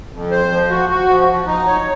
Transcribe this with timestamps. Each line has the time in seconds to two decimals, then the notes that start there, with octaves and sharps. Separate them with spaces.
0.13 F2
0.31 C5
0.51 F3
0.70 F#4
0.90 F#4
1.09 F3
1.28 F3
1.47 D#4
1.67 C#5